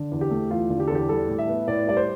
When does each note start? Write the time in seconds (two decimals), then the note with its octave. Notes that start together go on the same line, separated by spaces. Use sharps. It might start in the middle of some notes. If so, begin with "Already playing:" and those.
Already playing: D3
0.11 E2
0.21 G4
0.31 A3
0.50 E2 F4
0.70 D3
0.80 G4
0.87 E2 A4
0.95 G4
1.09 G3 A4
1.28 A2
1.38 E5
1.48 B3
1.67 A2 D5
1.87 G3 D5
1.97 C5